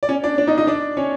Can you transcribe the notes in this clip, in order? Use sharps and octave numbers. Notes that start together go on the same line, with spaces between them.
D5
C#4 C#5
D4 D5
D4 D5
D#4 D#5
D#4 D#5
D4 D5
C#4 C#5